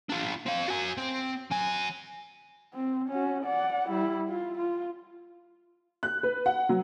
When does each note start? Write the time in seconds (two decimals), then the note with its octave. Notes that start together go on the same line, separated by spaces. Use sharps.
0.09 D4 F4
0.46 C4 F5
0.68 F#4 G#5
0.98 C4
1.51 F#3 G#5
2.74 C4
3.09 C#4 F#4
3.44 D5 F#5
3.89 G3 E4
4.29 F4
4.58 F4
6.03 F#6
6.23 B4
6.46 F#5
6.69 F#3